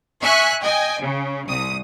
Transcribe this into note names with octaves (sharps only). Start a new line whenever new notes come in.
E5 G#5 C#6 F#6
D#5 G5 G#5
C#3
C2 D#6